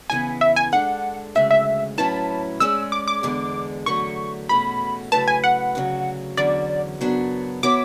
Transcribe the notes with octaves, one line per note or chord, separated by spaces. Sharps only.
C#3 E3 B3 E4 B4 G#5
E5
G#5
G#3 D4 A4 F#5
D2 C#3 G#3 E5
E5
A2 F#3 C#4 E4 B4 A5
G#3 C#4 G#4 D5 E6
D6
D6
E2 D3 G#3
E2 D3 F#3 A3 C#6
E2 B2 A3 C#4 F#4 B5
C#3 F#3 A3 E4 B4 A5
G#5
F#5
D2 C#3 F#3
E2 D3 F#3 C#4 D5
F#2 C#3 F#3 B3 D4
E3 B3 F#4 C#5 E5 D6